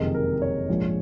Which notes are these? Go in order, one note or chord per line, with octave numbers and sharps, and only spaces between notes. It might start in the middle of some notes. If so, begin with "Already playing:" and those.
Already playing: F#1 F2 C3 D#3 G#3 D#5
A#4
C#5
A#1 G#2 F3 G#3